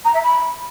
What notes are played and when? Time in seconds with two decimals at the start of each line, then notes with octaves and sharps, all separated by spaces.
0.05 A#5
0.14 E5
0.23 B5